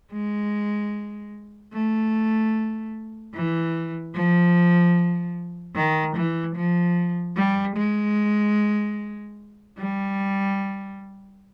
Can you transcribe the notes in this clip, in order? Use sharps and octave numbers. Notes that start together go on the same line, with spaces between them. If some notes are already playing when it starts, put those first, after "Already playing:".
G#3
A3
E3
F3
D#3
E3
F3
G3
G#3
G3